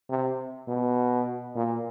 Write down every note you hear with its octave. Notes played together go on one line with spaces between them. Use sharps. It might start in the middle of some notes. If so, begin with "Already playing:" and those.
C3
B2
A#2